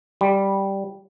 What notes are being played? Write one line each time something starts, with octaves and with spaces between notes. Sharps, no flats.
G3